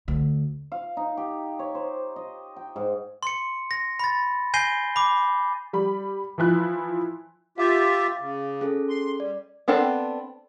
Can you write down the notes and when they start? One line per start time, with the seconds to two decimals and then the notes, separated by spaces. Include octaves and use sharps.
0.08 D2
0.72 F5
0.97 D#4
1.17 G4
1.59 C#5
1.75 C5
2.16 D#5
2.56 G5
2.76 G#2
3.23 C6 C#7
3.71 A#6
3.99 B5 A6
4.54 G#5 G6 A#6 C7 D#7 G7
4.96 B5 D6
5.73 G3 B5
6.38 E3 F3 E4 F#6
7.58 F4 G4 E5 F5 D6 A6
8.20 C#3
8.61 C#4 G#4 A4
8.89 C6
9.20 G3 D5
9.68 B3 C4 D4 A4 C5